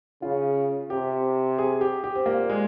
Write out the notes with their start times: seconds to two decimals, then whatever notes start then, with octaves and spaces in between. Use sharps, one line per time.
0.22 C#3 F4
0.90 C3 G4
1.58 G#4
1.81 G4
2.04 G4
2.15 C4
2.26 A#2 A#3
2.49 G#3